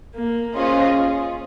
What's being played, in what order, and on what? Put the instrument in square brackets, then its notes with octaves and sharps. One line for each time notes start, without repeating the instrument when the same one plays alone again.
[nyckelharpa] A#3
[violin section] C#4 F4 G#4 C5 D#5